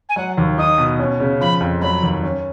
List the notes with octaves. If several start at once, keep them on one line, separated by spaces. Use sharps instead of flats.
G#5
F#3 F#5
D#2
D#4 D#6
B2
C#4
C#3
F3 B5
F2
F#3 B5
D#2
C#4